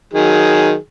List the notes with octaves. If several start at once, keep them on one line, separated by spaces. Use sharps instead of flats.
D#3 F#3 G#4